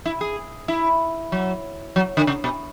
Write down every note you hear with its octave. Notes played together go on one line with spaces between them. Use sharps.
E4
G#4
E4
F#3
F#3
D3
C#3
B2